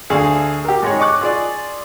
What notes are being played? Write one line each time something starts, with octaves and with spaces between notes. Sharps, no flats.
D2 G#4 F5
G4 A#4
G#2 G#3 C#5
D#5 C#6 D6 F#6
F4 G#4 D5